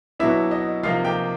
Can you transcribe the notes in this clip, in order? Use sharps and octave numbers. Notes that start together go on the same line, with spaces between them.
B2 F#3 B3 D4 E4 E5
D#5
C3 F3 A#3 D#4 F4 F5
G4 G5